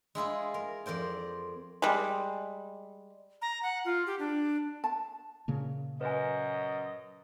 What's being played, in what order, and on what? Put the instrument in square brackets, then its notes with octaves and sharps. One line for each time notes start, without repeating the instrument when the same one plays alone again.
[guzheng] G#3 E4 F4 G#4
A#4
F2 A#4 C5 D5
[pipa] G3 G#3
[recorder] A#5
F#5
F4
G4
D4
[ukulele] A5
[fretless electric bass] A#2 C#3 A#3
[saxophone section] F#2 D#5 [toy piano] B4 G#5